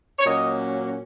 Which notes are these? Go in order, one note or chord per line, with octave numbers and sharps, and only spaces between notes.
C#5
A#2 F#3 A#3 C#4 D#5